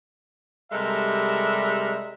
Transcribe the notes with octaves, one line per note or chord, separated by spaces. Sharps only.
C3 G3 G#3 A4 A#4 E5